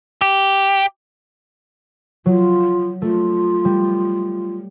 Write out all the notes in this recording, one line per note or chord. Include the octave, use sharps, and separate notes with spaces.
G4
F#3 F4
A3 F4
G3